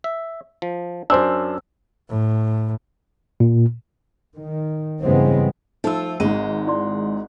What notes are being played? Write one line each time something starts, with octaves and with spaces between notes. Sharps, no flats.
E5
F3
F#2 D4 C5 G#5 E6
A2
A#2
D#3
G2 C#3 E3 G#3 B3 C4
F3 A3 D#4 F4 E6
G#1 G#2 G#3 G#4 D#7
E4 D5 C6